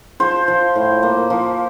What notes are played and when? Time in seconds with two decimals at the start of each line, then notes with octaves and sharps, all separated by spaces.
0.20 F3 C5
0.48 F3
0.75 A2
1.03 A#3
1.30 F3